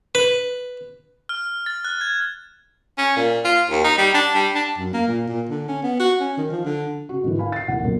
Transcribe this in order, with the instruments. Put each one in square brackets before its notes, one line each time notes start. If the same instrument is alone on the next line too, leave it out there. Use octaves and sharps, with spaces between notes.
[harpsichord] B4
[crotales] F6
A6
F#6
G#6
[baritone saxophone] C#4
A#2
F4
D#2
D#4
G3
D4
G3
D4
F#2
A#3
A#2
A#2
D3
C#4
B3
F#4
C#4
D#3
F3
D3
[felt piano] C#3 F#4
G#2 D3 E3
F5 G#5 B5
A6 C7
F1 A#1 D#2 E4 F#5
F#1 B1 A#2 F#3 C#4